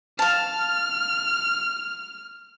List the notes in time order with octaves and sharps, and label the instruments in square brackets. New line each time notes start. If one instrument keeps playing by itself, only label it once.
[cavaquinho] F5 A5 [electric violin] F6